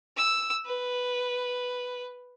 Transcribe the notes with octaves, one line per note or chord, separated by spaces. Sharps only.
E6
B4